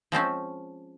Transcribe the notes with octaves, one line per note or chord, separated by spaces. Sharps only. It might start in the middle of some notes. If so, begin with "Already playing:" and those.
F3 G#3 C4 C#4